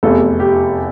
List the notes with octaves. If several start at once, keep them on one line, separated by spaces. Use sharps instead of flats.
F1 E2 C3 A4
G4